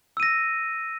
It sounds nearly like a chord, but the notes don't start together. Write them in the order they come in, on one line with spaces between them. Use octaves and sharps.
E6 D#7 A#6